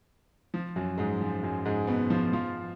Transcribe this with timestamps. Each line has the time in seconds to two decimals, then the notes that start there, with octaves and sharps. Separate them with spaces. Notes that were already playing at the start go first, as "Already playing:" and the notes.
0.54 F3
0.76 F#2 F#3
0.98 G#2 G#3
1.21 F3
1.43 F#2 F#3
1.65 G#2 G#3
1.87 B2 B3
2.10 F3 F4
2.33 F3 F4